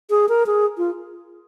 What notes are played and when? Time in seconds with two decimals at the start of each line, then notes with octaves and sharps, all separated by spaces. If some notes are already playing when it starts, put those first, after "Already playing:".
0.10 G#4
0.29 A#4
0.46 G#4
0.78 F4